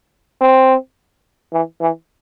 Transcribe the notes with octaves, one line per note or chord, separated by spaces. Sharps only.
C4
E3
E3